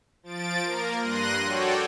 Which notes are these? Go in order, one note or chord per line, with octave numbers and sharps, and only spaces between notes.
F3 A6 D7
A#3 A#4
G2 C6 F#6 A#6 D#7
F#4 A4 C#5 D5 G5